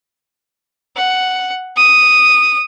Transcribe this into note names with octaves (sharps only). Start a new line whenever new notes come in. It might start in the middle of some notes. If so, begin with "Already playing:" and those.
F#5
D#6